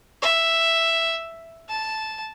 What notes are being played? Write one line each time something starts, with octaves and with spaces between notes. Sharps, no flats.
E5
A5